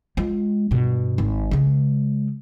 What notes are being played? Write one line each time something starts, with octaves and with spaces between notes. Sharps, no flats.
G#3 F4
G2 B2
G#1
C#3 G#3